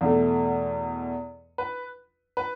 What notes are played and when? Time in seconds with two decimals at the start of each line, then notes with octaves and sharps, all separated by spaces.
0.01 E2 B2 A3
1.58 B4
2.37 B4